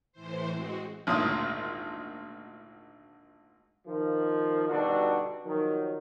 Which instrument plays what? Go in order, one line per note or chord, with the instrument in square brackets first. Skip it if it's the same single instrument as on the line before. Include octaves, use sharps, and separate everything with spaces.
[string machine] A2 E3 C5
G#3 C4 F#4
[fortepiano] G#1 D2 A#2 D#6
[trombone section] D#3 F3
B2 D3 G3 D4 D#4 F#4
D#3 F3 F#3